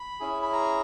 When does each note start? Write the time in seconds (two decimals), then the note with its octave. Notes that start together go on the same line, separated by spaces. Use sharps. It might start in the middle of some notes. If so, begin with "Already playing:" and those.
Already playing: B5
0.20 C#4 E4 G#4
0.42 B5
0.52 A#5